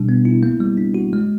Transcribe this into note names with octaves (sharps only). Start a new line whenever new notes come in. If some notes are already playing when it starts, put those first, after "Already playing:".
Already playing: B2 G3 D4
B3
E4
A#3
G3
D4
F#4
G#3